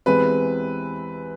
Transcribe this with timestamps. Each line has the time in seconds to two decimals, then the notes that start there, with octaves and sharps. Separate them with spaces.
0.06 E2 C3 E3 G#3 C4 B4